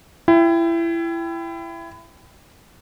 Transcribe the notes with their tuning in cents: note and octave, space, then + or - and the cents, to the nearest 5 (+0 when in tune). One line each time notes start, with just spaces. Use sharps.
E4 +25 G5 +0